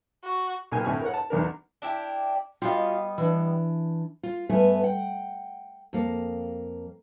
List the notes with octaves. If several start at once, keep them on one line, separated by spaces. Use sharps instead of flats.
F#4
B1 A#2 A#3 G5 G#5
D2 A2 C4 E4 G#5 F6
A#4 C#5 F#5
A5
B1 E2 D4 A#4
D4 E4 G4
G3 B3 F4 F#4 D#5 F5
E3 D4
F4
G2 A3 B3 E5 G#5
F#5 G5
F2 A#3